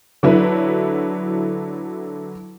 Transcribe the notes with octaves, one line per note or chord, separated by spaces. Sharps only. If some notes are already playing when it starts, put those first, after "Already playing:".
D3 F#3 E4 B4